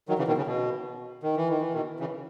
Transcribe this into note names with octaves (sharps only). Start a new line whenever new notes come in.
D#3 F#3
C#3 E3
B2 D#3
C#3
B2
D#3
E3
D#3
E3
B2 D#3
C#3 E3